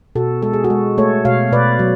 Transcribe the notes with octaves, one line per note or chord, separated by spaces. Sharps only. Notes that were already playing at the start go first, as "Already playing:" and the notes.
B2 F#4 A4
G#3 A4
G#4
F#4 A4
G#3
A3 A4 C#5
B2 C#5 F5
B2 B4 D5
F#3